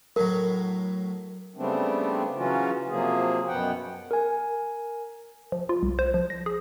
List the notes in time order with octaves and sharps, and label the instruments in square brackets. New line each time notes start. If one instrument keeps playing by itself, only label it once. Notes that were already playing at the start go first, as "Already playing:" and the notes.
[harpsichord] A2 F#3 [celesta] A#4
[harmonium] C#3 G3 A3 B3 C4 D4
C#3 E3 F#3 C#4 F4 F#4
C3 F3 F#3 A#3 G#4
F#2 B2 B3 F#5 G5
[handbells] A#4 G#5
[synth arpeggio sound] F3
F4
C2
C5
F3
A#6
G#4